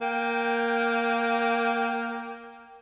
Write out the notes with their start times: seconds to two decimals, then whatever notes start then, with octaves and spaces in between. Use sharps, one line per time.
0.01 A#3 G5